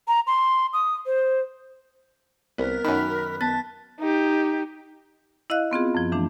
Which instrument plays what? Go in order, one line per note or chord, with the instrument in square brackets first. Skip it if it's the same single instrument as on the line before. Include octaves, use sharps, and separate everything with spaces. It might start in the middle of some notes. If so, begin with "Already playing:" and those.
[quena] A#5
C6
D#6
C5
[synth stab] C2 [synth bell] B3 [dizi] A#4
[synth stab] F#2 D#3 [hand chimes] B5 F#6 [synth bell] B6
[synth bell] B3 [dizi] A5 [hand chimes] A6
[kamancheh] D#4 G4
[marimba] E4 D#5 F5 F#6
B3 C4 F4 G#4
F#2 F3
E3 A3 D4